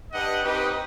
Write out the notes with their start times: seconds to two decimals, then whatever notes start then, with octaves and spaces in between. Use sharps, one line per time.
0.13 D4 G4 B4 D#5 F#5
0.42 C4 D#4 G4 B4 D#5